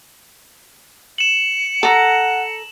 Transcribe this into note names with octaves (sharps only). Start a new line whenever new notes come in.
C#7 E7 F#7
A4 F#5 A#5